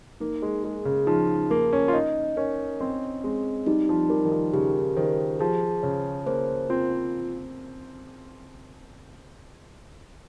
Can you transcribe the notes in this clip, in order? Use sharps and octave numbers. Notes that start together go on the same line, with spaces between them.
A#3 D#4
G#3
G#3 G#4
C#3
F3 D#4
A#3 A#4
C#4
F4
D#4 D#5
C#4 A#4
C4 D#5
G#3 C4
G3 D#4
F3
G3 A#4
D#3
F3
C#3 G4
D#3 C5
F3 G#4
C#3 C#5
A#3 C5
C4 F4